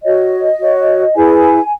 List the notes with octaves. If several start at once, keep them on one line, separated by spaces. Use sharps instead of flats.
F#4 C#5 D#5
F#4 C#5
E4 G#4 B4 G#5